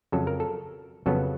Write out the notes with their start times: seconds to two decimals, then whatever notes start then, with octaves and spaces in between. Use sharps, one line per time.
0.12 F2 C#3 F#3 A4
0.27 A#4
0.40 A4
1.06 F2 C#3 F#3 B3 A4